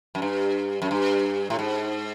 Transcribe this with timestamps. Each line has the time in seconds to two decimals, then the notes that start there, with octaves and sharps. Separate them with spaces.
0.15 F#2
0.22 G2
0.82 F#2
0.91 G2
1.50 A2
1.59 G#2